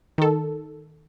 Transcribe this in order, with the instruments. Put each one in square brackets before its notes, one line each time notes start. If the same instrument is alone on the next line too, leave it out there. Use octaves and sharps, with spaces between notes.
[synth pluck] D#3 A4